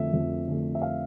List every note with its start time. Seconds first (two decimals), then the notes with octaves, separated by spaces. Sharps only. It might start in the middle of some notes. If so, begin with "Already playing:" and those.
Already playing: F2 D3 A3 E5
0.13 F2
0.48 D3 A3
0.75 E5
0.82 F5